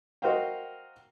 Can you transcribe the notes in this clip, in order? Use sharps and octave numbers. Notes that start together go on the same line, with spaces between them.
F#4 A#4 C5 D#5 F5 G5